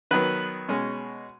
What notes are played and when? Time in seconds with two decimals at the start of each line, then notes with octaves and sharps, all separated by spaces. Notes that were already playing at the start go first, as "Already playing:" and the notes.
0.11 D#3 F#3 B3 B4
0.69 B2 G#3 C#4